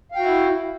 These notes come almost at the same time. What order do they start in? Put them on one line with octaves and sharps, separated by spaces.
F5 G5 F#4 E4